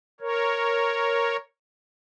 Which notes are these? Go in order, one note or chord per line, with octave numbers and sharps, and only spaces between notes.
A#4 C#5